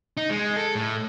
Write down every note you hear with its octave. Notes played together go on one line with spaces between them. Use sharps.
D#4
G#3
A4
A2